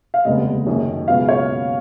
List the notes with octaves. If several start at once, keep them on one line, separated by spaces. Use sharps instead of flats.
F5
F1 D#2 C#3 G#3 B3 D#5
F#1 F#2 D#3
C#2 B2 F#3 B3 F5
C#5